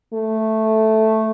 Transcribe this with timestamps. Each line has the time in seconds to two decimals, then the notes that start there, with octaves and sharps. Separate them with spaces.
0.14 A3